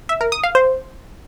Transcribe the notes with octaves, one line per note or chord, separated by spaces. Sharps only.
E5
A#4
D#6
F5
C5